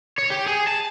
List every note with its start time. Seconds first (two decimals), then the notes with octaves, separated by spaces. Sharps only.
0.18 C#5
0.30 G4
0.46 G#4
0.67 A5